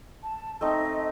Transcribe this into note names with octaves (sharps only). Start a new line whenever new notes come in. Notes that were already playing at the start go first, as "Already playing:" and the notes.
A5
A3 C4 D#4 D#5